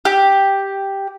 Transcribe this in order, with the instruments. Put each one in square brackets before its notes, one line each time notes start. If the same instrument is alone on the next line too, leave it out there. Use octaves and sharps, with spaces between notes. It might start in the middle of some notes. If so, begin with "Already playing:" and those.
[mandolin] G4